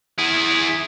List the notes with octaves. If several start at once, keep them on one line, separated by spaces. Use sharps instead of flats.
E4 G#4